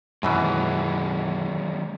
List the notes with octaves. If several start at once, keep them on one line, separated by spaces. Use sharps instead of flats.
F#2 B2 D#3 E3 F#3 G#3